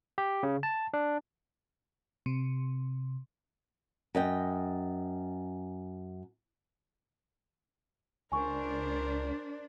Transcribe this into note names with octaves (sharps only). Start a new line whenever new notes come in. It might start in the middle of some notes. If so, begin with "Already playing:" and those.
G4
C#3
A5
D4
C3
F#2 D#5 G5
C#2 D4 A#4 C5 G#5 C#6